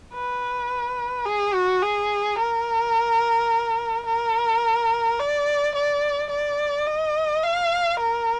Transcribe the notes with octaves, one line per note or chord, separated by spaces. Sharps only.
B4
G#4
F#4
G#4
A#4
A#4
D5
D5
D5
D#5
F5
A#4